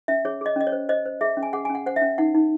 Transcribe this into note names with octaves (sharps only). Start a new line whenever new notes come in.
C#4 E5
G#4 C#5
G#4 D#5
C#4 D#5
C#5
C5
C5 D#5
C5
G#4 E5
C#4
G#5
G#4 F#5
C#4 G#5
F#5
C5 F#5
E5
C#4
D#4 F#5
D#4